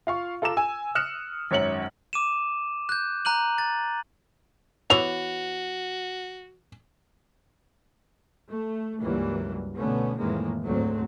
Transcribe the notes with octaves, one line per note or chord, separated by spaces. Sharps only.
F4 F5 C#6
F4 A4 A#5 D6 E7
G#5 E6
D#6 F6 F#6 C#7 E7
G#1 F#2 C#5 C#7 F#7
D6 D#7 E7
F#6 G6
A#5 F#6 D#7 F#7
A6
E3 B3 F#4 C#5 F7
A3
C#2 G2 E3 F#3 G3 A#3
B2 D3 A3 B3 C#4
F2 A2 D#3 E3 G#3 A#3
G#1 D2 G#2 F#3 A3 C4